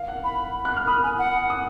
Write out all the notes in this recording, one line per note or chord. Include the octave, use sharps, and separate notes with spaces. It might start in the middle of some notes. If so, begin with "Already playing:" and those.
Already playing: F5
F#5
B5
F#6
F6
B5 D#6
G#5
F#5
D#6